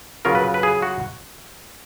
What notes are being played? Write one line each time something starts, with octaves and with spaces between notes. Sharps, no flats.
C#3 F#3 C#4 F4 A#4
B4
B4
G#4
F#4